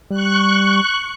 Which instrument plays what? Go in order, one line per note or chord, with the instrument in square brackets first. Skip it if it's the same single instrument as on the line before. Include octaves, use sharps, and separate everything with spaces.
[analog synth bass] G3 [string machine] C#6 F#6